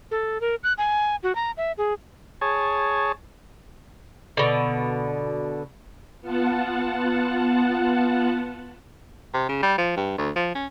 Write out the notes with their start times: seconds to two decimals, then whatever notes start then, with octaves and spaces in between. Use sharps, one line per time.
0.11 A4
0.41 A#4
0.64 F#6
0.78 G#5
1.23 F#4
1.35 A#5
1.57 E5
1.78 G#4
2.41 G#4 C#5 A5
4.37 B2 D3
6.21 B3 F4 F#5 A5
9.34 C3
9.49 C#3
9.62 G3
9.78 F3
9.96 G2
10.18 D2
10.36 F3
10.55 C#4